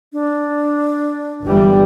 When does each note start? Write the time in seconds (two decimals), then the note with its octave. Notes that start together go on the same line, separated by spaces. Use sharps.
0.13 D4
1.44 G1 E3 G3